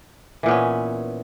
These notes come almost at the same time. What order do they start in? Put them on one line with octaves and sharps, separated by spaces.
E3 A#2 B3 C#4